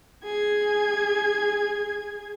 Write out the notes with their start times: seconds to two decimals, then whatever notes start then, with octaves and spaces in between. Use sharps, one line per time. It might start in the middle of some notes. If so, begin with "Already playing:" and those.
0.24 G#4 G#6